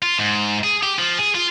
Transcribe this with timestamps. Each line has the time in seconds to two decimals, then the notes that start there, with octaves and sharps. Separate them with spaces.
0.02 F4
0.19 G#2
0.64 G#4
0.83 G4
0.98 F3
1.18 G#4
1.35 F4